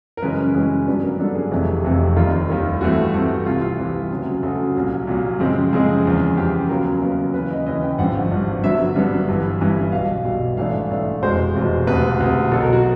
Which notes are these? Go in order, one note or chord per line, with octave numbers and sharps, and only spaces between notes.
A#4
F#2 C#3 E3 G#3 C#4 B4
F#2 C#3 E3 G#3 C#4
G2 D3 F#3 B3 D4 B4
A#4
G2 D3 F#3 B3 D4 A4
G#4
F1 F2 C3 E3 A3
F1 F2 C3 E3 A3
D#2 D#3 G3 F4
D#2 D#3 G3
G2 E3 A3 C4 F#4
G2 E3 A3 C4
C2 C3 E3 F4
F4
C2 C3 E3
D2 C#3 F#3
D2 C#3 F#3 A4
C2 A#2 F#3
C2 A#2 F#3
F#2 C#3 F3 G#3 C4
F#2 C#3 F3 G#3 C4 G#4
E2 C#3 F3
E2 C#3 F3 G4
D#2 C#3 F#3 B3 A#4
D#2 C#3 F#3 B3
D#2 C#3 E3 B4
D#5
D#2 C#3 E3 D#5
G5
G#1 G2 D3 F3 F#5
G#1 G2 D3 F3
G2 D3 F#3 B3 E5
G2 D3 F#3 B3
G1 G2 E3
G1 G2 E3
B1 B2 G3 F5
B1 B2 G3
G#2 E3 A3 D4 F5
G#2 E3 A3 D4
F1 E2 B2 G#3 C5
F1 E2 B2 G#3
E1 D2 C3 B4
E1 D2 C3
B1 B2 F#3 B3 A4
A#4
F#4